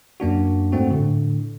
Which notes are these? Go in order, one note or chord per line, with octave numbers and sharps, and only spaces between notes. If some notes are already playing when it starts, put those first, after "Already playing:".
F#2 A#3 D4 F#4
G#2 A3 C4 F#4
A2 D3